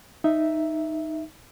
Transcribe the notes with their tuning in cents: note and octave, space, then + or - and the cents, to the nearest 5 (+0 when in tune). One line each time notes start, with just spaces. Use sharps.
D#4 +0 E5 +0